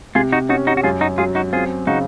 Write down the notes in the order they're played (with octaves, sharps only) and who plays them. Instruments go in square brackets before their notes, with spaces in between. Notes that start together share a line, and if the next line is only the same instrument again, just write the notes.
[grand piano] C3 [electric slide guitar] F4 G#4
[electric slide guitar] D#4 F#4
[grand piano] C#4 [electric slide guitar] D#4 F#4
[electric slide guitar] D#4 F#4
F#4
[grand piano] F#2 [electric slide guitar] F4 G#4
[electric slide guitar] D#4 F#4
[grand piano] F#3 [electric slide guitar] F4 G#4
[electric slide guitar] D#4 F#4
[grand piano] C4 [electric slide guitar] F4 G#4
[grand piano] C#3 [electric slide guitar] D#4 F#4